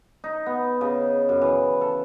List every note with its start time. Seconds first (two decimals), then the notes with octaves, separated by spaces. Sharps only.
0.24 D#4
0.46 B3
0.81 C#3
1.29 F#2
1.42 E3
1.81 A4